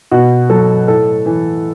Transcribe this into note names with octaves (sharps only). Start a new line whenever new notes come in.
B2 F#4
F#3 A4
A2 A4
E3